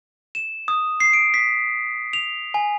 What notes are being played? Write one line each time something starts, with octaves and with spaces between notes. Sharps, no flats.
E7
D#6
C7
D7
B6
F7
G#5